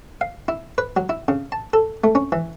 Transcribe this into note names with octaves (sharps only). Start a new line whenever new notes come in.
F5
E4
B4
F#3
E4
C#3
A5
A4
A3
C#4
E3